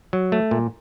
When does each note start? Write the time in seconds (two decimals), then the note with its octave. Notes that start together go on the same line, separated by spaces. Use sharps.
0.13 F#3
0.32 A3
0.51 A#2